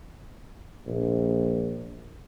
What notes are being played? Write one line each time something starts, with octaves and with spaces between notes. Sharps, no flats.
A#1